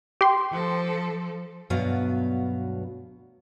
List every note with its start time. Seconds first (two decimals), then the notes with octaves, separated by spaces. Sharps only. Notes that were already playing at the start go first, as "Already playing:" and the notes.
0.21 G4 C6
0.51 F3 A4
1.70 D2 G2 B2 F#3 B3 F5